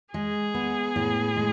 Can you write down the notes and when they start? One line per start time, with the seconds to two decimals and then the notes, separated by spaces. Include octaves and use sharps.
0.14 G#3 G#4
0.54 B3
0.96 A2
1.36 G#3